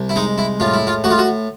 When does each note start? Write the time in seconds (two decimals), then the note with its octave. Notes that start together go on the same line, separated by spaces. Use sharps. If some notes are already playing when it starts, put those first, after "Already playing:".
Already playing: C2
0.09 E4
0.16 G#3 D#4
0.38 E4
0.60 A2 F4
0.73 E4
0.87 F4
1.04 A2 F#4
1.11 F4
1.18 F#4